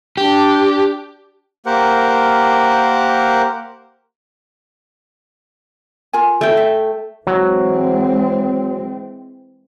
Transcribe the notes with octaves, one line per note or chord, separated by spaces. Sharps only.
D4 G4
A#3 G4 A#4 C5 F#5
F4 A#4 G#5
A3 E4 G5
E5
E3 F#3 G#3 C4